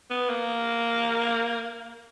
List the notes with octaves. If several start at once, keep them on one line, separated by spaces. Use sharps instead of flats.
B3
A#3